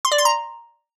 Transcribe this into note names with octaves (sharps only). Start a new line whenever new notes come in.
C6
D5
C6
A#5